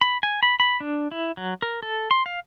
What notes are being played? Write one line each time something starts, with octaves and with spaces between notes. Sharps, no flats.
B5
G#5
B5
B5
D4
E4
F#3
A#4
A4
C6
F5